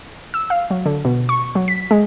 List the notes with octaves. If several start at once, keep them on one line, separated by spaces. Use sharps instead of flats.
E6
F5
F#3
D3
B2
C#6
F#3
B6
G#3